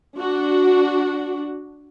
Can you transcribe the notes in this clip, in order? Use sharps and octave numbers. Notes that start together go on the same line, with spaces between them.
D4 F#4